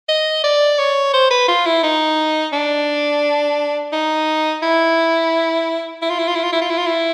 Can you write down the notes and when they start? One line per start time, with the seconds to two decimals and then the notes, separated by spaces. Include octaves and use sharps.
0.09 D#5
0.44 D5
0.79 C#5
1.13 C5
1.31 B4
1.48 F4
1.66 E4
1.83 D#4
2.53 D4
3.93 D#4
4.63 E4
6.02 E4
6.10 F4
6.19 E4
6.28 F4
6.35 E4
6.44 F4
6.53 E4
6.61 F4
6.70 E4
6.78 F4
6.87 E4